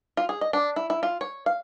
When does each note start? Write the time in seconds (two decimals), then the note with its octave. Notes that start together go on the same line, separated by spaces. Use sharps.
0.17 F4
0.29 G#4
0.41 D#5
0.53 D4
0.76 E4
0.90 E4
1.03 F4
1.21 C#5
1.46 F5